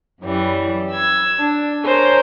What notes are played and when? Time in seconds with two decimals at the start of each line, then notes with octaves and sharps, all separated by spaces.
0.21 F#2 E3 G3 C#4
0.90 E6 G#6
1.39 D4
1.83 A#4 C5 C#5 G#5